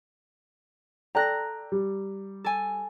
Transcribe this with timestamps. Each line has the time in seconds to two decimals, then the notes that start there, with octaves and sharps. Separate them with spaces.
1.15 A4 D5 G5 A#5 F#6 A#6
1.72 G3
2.44 A4 G#5